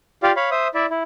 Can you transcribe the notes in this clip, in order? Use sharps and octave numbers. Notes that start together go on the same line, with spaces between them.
F4 G4 D5 F5
C#5 F5 B5
C5 E5 D#6
E4 D5 E5
E4